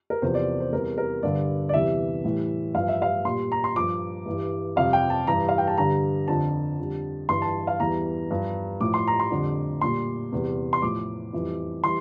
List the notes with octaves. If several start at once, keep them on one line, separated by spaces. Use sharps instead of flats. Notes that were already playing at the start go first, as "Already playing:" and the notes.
A#4
E2 C3 F3 C5
D5
C5
E2 C3 G3 A#4
A#4
G2 D3 G3 D5
D5
E2 C3 E3 G3 E5
A2 E3 G3
G2 F3 F5
E5
F5
A#2 G3 C6
A#5
C6
G2 F3 D6
G2 E3 G3
F2 C3 G3 F5
G5
A5
G2 E3 G3 A#5
F5
G5
A5
G2 D3 G3 A#5
F2 D3 F3 A5
F2 D3 G3
G2 E3 G3 C6
A5
F5
E2 E3 G3 A#5
G2 F3
A2 F3 D6
C6
A#5
C6
F2 D3 G3
A#2 G3 C6
E2 C3 G3
C6
A2 F3 D6
F2 E3 G3
E3 G3 C6